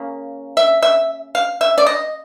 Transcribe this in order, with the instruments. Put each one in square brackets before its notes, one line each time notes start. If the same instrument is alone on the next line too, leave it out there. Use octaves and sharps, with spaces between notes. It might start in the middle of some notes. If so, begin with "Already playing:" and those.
Already playing: [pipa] C#3 A#3
E5
E5
F5
E5
D5
D#5